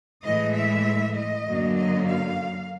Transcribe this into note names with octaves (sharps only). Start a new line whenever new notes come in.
A2 E3 G#3 D#5
E5
D#5
F#2 D3 F#3 A#3
D#5
F5